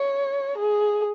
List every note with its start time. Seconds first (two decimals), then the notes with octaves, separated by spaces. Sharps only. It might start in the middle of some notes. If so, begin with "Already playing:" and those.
Already playing: C#5
0.58 G#4